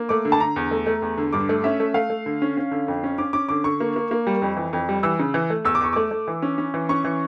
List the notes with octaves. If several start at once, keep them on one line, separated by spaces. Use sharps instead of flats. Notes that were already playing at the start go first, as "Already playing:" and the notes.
Already playing: A#3
A3 D6
D3
A5
D3 A#5
E2
A3
A3
E2
D3
G2 D6
A3
C#4 E5
A3
A3 F5
A3
D3
C#4
C#4
D3
F2
C#4
C#4 D6
C#4 D6
D3 D6
D3 C#6
A#3
A#3
A#3
G3
F2
E3
F2
G3
E3 E6
C#3
E3
A3
E2 E6
D6
E2 C#6
A3 D6
A3
E3
C#4
C#4
E3
C#4 C#6
E3